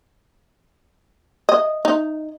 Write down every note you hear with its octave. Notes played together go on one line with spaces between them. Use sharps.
D#5
D#4